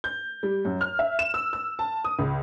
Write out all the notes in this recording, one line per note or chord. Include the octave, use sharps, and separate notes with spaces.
G6
G3
F#2
F6
E5
E7
E6
E6
A5
D#6
C#2